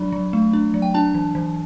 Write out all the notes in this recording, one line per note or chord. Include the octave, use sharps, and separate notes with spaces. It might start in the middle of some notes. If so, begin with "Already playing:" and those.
Already playing: F#3 D4 B5
F#3
A3
D4
F#3
G5
D4 A5
E3
E3